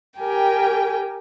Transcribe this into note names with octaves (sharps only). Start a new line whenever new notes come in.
G4 A#4 G5 G#5